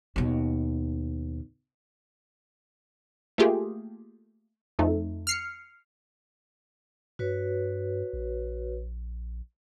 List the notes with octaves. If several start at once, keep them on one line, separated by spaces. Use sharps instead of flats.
D#2 B2
A3 A#3 F4 G4 G#4
F2 A3 D#4
F6 C7 C#7
G2 F#4 B4 C#5
A#1